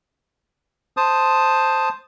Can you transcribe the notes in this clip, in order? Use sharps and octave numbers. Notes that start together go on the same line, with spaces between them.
C5 A5 D#6